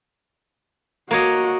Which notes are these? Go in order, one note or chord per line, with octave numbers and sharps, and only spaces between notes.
A#3 F#4 C#5 D#5